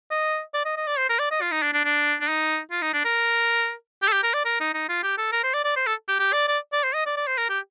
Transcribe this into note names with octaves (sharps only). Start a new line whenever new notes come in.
D#5
D5
D#5
D#5
D5
C5
A#4
D5
D#5
F4
D#4
D4
D4
D4
D4
D#4
F4
D#4
D4
A#4
G4
A4
G4
A#4
D5
A#4
D#4
D#4
F4
G4
A4
A#4
C5
D5
D5
C5
A4
G4
G4
D5
D5
D5
C5
D#5
D5
D5
C5
A#4
G4